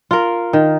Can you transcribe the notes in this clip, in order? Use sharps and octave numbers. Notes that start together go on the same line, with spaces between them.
F4 A#4
D#3